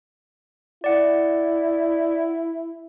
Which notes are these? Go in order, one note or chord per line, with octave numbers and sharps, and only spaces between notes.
E4 D5 F#5